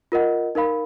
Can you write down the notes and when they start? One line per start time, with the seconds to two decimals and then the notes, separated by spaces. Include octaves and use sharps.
0.12 F4 A#4 D#5 F#5
0.55 D#4 A#4 F5 B5